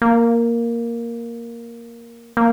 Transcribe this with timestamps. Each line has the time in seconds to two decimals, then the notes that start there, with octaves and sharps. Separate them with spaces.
0.02 A#3
2.37 A#3